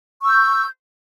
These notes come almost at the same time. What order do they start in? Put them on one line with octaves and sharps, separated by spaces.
C#6 E6 G6